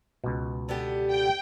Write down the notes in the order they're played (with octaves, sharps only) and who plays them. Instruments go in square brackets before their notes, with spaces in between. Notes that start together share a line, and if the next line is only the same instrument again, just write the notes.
[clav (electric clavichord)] C#2 B2
[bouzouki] D3 B3 G4
[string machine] G5